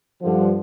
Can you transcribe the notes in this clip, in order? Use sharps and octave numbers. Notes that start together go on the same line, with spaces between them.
G2 D3 F3